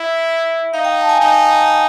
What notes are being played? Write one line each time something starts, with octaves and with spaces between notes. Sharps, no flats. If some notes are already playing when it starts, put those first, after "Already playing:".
Already playing: E4 E5
D#4 F5
G5
A5
G#5
D#4 G#5